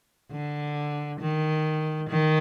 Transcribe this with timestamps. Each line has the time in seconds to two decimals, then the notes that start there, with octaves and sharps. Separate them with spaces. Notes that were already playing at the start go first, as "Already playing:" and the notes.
0.31 D3
1.20 D#3
2.09 D#3